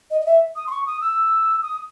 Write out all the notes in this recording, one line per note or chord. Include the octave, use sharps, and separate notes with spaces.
D#5
D#5
E5
D#6
C6
C#6
D#6
E6
D#6